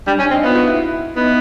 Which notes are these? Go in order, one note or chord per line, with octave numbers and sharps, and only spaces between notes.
G3 D4
C#4 D4
C4 D#4
B3 F4
F#4
E4
B3 D#4